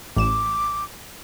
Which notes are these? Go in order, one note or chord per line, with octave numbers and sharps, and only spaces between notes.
A1 D6 E7